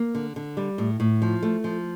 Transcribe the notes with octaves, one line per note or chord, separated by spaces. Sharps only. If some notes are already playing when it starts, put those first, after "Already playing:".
Already playing: A#3
D3
D3
G3
A2
A2
F3
A3
F3